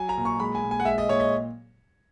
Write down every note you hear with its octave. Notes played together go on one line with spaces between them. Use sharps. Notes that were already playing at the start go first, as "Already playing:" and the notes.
Already playing: F#3 G#5
A#5
A#2
C#6
G#3 B5
G#5
A#2
G#5
F#5
G#3 E5
D#5
A#2 C#5
D#5